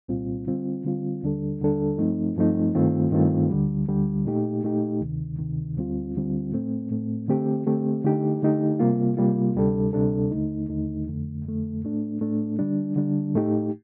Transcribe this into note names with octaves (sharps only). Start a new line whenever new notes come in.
C2 A#2 G3 C4 F4
D3 G3 C4 F4
D3 G3 C4 F4
D#2 D3 G3 D4 A4
D#2 D3 G3 D4 A4
G2 F3 A3 C4 D#4
G2 F3 A3 C4 D#4
G2 D#3 A3 C4 F4
G2 D#3 A3 C4 F4
D2 D3 G3
D2 D3 G3
A#2 A3 D#4 G4
A#2 A3 D#4 G4
D2 C3 D#3
D2 C3 D#3
D2 D3 G3 C4 F4
D2 D3 G3 C4 F4
A2 A3 C4
A2 A3 C4
D3 A3 C4 G4
D3 A3 C4 G4
D3 A3 D#4 G4
D3 A3 D#4 G4
C3 G3 A#3 F4
C3 G3 A#3 F4
D2 C3 G3 D4 A4
D2 C3 G3 D4 A4
D#2 D3 A3 D#4
D#2 D3 A3 D#4
F2 D3 A3
F2 D3 A3
A2 A3 D4
A2 A3 D4
D3 G3 D4
D3 G3 D4
A2 A3 D#4 G4